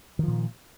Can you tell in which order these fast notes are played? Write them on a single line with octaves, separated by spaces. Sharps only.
D#3 F3 A#2